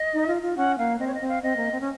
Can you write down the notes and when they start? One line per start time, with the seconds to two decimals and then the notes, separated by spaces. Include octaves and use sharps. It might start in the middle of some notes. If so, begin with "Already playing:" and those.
Already playing: D#5
0.14 D#4
0.27 F4
0.42 F4
0.57 C#4 F#5
0.78 A#3 F5
0.99 C4 D#5
1.07 C#5
1.14 D#5
1.21 C4
1.29 F5
1.43 C4 D#5
1.57 A#3
1.71 C4
1.81 C#4